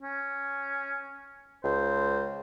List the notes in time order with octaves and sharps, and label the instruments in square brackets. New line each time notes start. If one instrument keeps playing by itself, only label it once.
[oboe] C#4
[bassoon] C#2 [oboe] C5